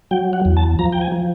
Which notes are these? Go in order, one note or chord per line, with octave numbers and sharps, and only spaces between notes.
F#3 G5
F#5
E2
A5
F3 A#5
G5
G#5
F3